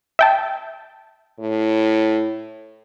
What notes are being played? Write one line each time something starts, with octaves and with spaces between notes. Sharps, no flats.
E5 G5 A5
A2